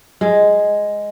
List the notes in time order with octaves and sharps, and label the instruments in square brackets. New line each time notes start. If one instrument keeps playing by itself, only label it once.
[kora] G#3